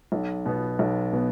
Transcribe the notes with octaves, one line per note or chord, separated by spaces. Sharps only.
B1
B2 B3
B1
B2 B3